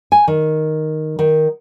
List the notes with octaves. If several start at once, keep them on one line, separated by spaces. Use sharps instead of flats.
G#5
D#3
D#3